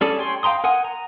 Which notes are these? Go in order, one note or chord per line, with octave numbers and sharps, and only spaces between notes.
G3 C#4 G#4 A4 D5
C#5 G5 G#5 C6
F5 G5 A#5 C6 D#6
A#4 F#5 G#5 D#6
A#5